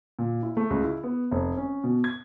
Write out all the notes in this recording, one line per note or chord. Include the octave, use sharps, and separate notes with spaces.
A#2
E4
A3
C#2
E4
B3
F1
C#4
B2
G#6